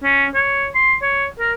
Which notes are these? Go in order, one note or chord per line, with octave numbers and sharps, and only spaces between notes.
C#4
C#5
C6
C#5
A#4